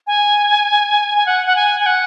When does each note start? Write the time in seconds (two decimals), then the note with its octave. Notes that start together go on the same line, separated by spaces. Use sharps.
0.07 G#5
1.17 G#5
1.26 F#5
1.46 F#5
1.56 G#5
1.80 G#5
1.86 F#5